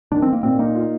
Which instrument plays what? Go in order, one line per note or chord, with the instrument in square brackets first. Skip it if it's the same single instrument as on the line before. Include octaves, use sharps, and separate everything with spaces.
[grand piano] D#3 [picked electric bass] D4
[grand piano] D#3 [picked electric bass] C4
[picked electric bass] A#3
[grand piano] A#2 [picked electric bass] C4
[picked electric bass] A#3 [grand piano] D#4
[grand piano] F4